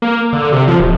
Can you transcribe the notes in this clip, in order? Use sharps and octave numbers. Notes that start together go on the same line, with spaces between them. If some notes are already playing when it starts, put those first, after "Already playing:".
A#3
D3
C3
F3
D#1